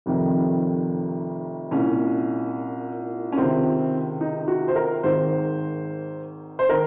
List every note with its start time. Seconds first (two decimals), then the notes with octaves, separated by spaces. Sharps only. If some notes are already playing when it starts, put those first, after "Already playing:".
0.06 F1 F2 C3 D#3
1.71 C2 A#2 C#4
3.32 C#4
3.37 C#2 C3 D#3 C4
4.21 D#4
4.48 F#4
4.68 C5
4.76 A#4
5.03 G#1 G#2 D#3 C5
6.59 C5
6.69 D#3 A#4